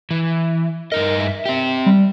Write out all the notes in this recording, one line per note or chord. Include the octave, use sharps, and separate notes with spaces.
E3
G2 D#4 A#4 D#5
E5
C4 G4
G3